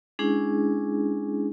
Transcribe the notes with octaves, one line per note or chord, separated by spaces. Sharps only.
G#3 C#4 D4 E4 G#4